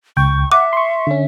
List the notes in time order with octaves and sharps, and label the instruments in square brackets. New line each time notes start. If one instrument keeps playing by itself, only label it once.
[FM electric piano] C#2 G5 [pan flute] C#6
[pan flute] E5 [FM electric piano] F#5 [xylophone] D6
[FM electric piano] C6 C#6
D3 C#4